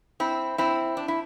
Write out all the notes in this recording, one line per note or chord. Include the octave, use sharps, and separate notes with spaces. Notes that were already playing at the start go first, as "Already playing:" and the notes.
C4 E4
C4 E4
D4
E4